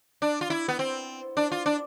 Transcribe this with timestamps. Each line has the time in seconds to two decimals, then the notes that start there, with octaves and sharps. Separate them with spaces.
0.22 D4
0.41 F4
0.50 E4
0.68 B3
0.79 C4
1.37 D4
1.52 F4
1.66 D4